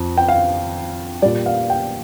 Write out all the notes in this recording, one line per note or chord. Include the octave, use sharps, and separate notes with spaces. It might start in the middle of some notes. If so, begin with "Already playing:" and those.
Already playing: F2
G5
F5
A#2 G3 D5
F5
G5